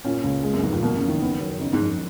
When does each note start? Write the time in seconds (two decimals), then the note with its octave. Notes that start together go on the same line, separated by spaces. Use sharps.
0.05 A#2 C#4
0.24 C#2
0.44 G#3
0.53 F#2
0.63 F1 G#2
0.73 A#2
0.82 B2 A#3
0.96 C#3
1.02 F#1
1.08 D#3
1.22 B3
1.40 F#2
1.60 C#3 D#4
1.73 G#2
1.80 F2